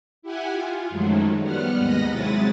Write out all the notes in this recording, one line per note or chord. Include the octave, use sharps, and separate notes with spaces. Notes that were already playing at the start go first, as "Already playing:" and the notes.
E4 G4 F#5 G#5
F4
F#2 D#3 F3 F#3 G#3 A3
G3 B3 F#5 F6 F#6
D#2 G#2 D#5 B5 A#6
C3 F#3 G#3 E4 D#6 A6